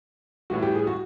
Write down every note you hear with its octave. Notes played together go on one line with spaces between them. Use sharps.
A2 E3 G3 F#4
G4
G#4
F#4